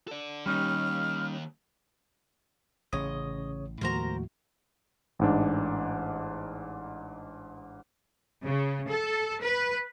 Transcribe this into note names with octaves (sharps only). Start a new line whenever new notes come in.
A4 D5
D#2 G3 C#4 D#4 F6
A1 C#3 C#5 D#5 D#6
D#2 A2 F3 G#3 F#4 A#4 C5 A#5
A1 G#2 D4
C#3
A4
B4